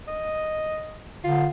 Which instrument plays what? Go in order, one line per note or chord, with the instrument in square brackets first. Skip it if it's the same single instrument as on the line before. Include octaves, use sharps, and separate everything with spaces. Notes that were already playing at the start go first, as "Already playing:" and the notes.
[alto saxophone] D#5
[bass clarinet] D3 [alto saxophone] F4